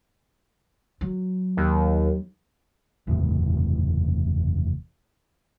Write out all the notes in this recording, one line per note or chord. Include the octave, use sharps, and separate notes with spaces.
F#3
D#2
F#1 E2 A2 C3